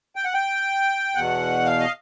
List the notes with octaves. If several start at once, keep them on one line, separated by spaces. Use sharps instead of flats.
G5
F#5
G5
E2 B2 F#5
F5
D#5